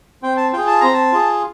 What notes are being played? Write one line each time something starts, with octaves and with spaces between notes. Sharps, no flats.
C4 G5
A5
F4 G#4 G5
A5
C4 A#5
A5
F4 G#4